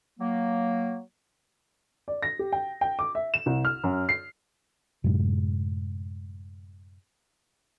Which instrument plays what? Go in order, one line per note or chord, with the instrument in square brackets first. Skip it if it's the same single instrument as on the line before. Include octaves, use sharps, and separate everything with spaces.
[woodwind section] F#3 A#3
[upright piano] D5
A#6
G4
G5
G5
D6
E5
E7
C2
F6
F#2
C7
[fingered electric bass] F#2 A2 C3 G#3